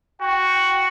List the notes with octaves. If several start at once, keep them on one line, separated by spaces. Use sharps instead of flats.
F#4 G5